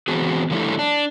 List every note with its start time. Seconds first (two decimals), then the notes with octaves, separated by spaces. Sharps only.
0.08 E3 B3 C4 F#4 G#4
0.50 D3 F3 G3 A3 D#4 E4
0.79 D4